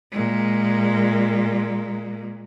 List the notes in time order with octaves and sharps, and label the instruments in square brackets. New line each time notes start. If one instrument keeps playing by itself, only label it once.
[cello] A#2 G#3